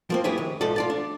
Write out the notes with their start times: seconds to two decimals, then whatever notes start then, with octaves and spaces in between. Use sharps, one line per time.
0.10 F3 A#3 C4
0.24 F#2 E4 G4 G#4 B4 C#5
0.38 D#3
0.61 B1 G#2 F3 A4 D5
0.76 F4 D5 A5
0.90 D4